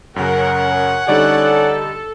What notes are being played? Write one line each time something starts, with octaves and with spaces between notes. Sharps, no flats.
F#2 C#3 C#4 A#4 F#5
D3 G3 D#4 A4 D5